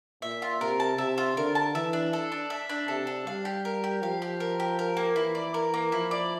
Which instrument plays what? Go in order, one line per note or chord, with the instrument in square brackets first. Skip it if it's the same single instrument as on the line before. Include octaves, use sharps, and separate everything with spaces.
[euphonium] A#2 [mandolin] E5
[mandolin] F4
[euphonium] C3 [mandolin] A#4
[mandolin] A5
[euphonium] C3 [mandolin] E5
[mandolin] F4
[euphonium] D3 [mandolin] A#4
[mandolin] A5
[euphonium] E3 [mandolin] E5
[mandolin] D4
A4
D4
E5
D4
[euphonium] C3 [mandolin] A4
[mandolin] D4
[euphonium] G3 [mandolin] F5
[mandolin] G4
A#4
G4
[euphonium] F3 [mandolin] F5
[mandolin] G4
A#4
G4
A#4
A#3
[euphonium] E3 [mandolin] E4
[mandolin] D5
A#4
A#3
[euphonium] F3 [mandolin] E4
[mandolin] D5